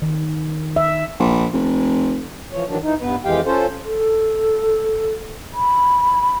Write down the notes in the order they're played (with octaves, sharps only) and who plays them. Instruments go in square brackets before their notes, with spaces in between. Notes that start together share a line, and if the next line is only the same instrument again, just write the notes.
[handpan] D#3
E5
[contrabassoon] A#1
F1
[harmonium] E3 F3 C#5
D#3 E3 F#3 D4
E3 D#4
G2 B3 B4
F2 E3 G#3 G4 F5 G5
C#4 F4 A4 C5
[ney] A4
B5